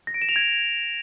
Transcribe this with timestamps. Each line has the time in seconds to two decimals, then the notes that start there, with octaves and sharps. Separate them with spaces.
0.07 A#6
0.14 D7
0.22 E7
0.29 F7
0.36 G#6